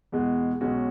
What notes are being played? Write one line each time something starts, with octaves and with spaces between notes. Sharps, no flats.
E2 B2 G#3
B1 B2 G#3 C#4 F#4